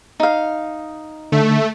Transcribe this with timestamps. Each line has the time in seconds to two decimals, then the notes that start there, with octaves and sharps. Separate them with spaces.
0.20 D#4 F5
1.32 D3 A3